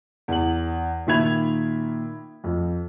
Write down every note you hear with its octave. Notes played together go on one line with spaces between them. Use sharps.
E2 F#7
A#2 D#3 E5 B5 G#6 F7
F2